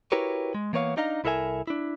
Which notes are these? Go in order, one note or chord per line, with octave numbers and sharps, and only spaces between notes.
E4 F#4 G4 A#4 B4 C#5
G#3
E3 A#3 B3 C#5 F5
D4 D#4 D#5 F5 A#5
C2 E4 A4 A#4 E5 G#5
D4 E4